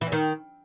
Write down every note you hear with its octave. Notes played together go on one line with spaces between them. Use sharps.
E3
E2
D#3